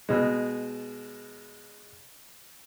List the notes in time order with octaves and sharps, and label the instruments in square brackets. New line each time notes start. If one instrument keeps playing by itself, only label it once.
[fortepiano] B2 G#3